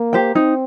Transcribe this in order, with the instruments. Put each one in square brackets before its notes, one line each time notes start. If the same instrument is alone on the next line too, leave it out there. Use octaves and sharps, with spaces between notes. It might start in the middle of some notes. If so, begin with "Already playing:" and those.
Already playing: [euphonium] A#3
[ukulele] G4 C5 G5
[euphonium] C4 [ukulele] D#4